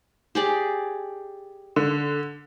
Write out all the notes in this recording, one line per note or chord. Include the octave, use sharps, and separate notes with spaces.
G4 G#4 D5
D3